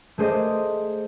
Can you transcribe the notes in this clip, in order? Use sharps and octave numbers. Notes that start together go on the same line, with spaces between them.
A3 G#4 C5 D5 D#5